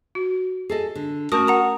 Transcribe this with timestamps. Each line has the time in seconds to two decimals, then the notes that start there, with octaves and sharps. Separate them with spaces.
0.15 F#4
0.69 G#4 A4 D#5
0.95 D3
1.32 A3 C#4 F#4 A#4 A5 D#6
1.47 F#5 A#5 D#6